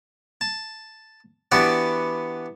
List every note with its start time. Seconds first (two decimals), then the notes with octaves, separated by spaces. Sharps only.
0.41 A5
1.52 E3 B3 D4 F#4 G4 D5